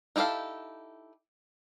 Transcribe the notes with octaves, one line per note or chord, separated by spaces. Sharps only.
D#4 E4 G4 A4 F5